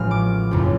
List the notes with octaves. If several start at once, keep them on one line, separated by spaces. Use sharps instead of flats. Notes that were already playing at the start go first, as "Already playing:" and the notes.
Already playing: A1 A2 F3 G#3 B3 F6
D6
F#1 F2 C#3